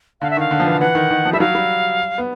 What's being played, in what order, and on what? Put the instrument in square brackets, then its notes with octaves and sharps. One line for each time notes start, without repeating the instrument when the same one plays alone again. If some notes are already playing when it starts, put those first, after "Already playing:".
[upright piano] D3 [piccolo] F5
[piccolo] E5
[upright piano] D#3 [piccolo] F5
[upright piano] D3
F3
E3
[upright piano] E3 [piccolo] F#5
[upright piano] D#3
D#3
F3
[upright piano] G3 [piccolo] E5
[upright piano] F#3 [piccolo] F5
[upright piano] G3
B3